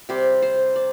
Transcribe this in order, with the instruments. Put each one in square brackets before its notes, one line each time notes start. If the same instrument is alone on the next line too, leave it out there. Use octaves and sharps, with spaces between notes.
[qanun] C3 G3 C4 D5
C5
D5